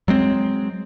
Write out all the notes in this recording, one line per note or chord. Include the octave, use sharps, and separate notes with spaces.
F#3 G#3 C4